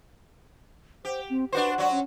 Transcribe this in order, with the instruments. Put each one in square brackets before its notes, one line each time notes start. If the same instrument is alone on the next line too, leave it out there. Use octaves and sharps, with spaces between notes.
[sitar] G4 [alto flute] C5
[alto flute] C4
[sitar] D4 F#4 C5 [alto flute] B4
[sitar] F#3 F#4 [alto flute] D5
[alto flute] C#4